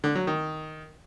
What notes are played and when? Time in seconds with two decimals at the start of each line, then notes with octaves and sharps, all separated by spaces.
0.04 D3
0.15 F#3
0.27 D#3